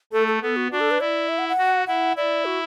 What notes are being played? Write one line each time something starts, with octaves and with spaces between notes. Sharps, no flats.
A3 A4
A4
B3 A4
F#4
D4 F#4
A4
B4
E4 D5
E5
F#5
F#5
F#4
E4 F#5
E4 D5
F#4